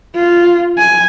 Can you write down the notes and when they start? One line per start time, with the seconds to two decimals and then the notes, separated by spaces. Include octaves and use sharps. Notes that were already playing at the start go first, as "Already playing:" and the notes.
0.15 F4
0.78 G#5